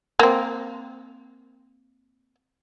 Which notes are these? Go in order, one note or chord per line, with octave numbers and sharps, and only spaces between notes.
A#3 C4